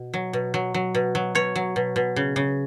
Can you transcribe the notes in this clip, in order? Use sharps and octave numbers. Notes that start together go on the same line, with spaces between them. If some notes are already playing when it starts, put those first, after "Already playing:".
Already playing: B2
F#3
B2
F#3
F#3
B2
F#3
B2 C#5
F#3
B2
B2
C#3
C#3